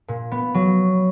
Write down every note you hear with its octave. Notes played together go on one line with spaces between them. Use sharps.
A#2
B3
F#3